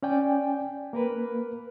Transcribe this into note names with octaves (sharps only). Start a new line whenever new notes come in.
C#4 D5 G5 G#5
A#3 A#4 B4